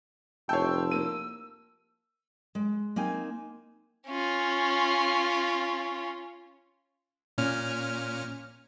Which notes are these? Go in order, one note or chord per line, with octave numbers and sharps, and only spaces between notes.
F1 C#5 G5 A5 C6 E6
A#3 D#7
G#3
A#3 C4 D#4 G#5
C#4 F4
A#2 C#4 F6